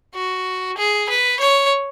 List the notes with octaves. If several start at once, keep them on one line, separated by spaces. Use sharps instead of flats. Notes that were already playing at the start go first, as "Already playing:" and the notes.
F#4
G#4
B4
C#5